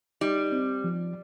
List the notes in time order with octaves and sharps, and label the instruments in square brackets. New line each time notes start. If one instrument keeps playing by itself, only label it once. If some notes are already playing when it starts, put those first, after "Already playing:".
[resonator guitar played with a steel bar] G3 [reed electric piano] D#4
[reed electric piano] C4
F3